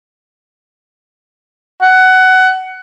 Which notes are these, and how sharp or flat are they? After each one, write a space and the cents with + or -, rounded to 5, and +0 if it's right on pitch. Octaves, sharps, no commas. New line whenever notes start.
F#5 +15